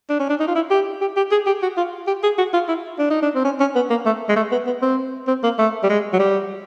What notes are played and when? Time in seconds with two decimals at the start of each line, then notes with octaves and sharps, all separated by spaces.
0.10 D4
0.19 C#4
0.30 D4
0.40 D#4
0.48 F4
0.55 E4
0.71 G4
1.01 G4
1.17 G4
1.31 G#4
1.47 G4
1.62 F#4
1.77 F4
2.07 G4
2.23 G#4
2.38 F#4
2.53 F4
2.68 E4
2.99 D4
3.10 D#4
3.22 D4
3.35 C4
3.45 C#4
3.60 C#4
3.76 B3
3.90 A#3
4.06 A3
4.29 G#3
4.36 A3
4.52 B3
4.67 B3
4.82 C4
5.28 C4
5.44 A#3
5.58 A3
5.83 G3
5.89 G#3
6.13 F#3
6.19 G3